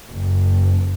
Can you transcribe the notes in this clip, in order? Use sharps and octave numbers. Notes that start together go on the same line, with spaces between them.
F#1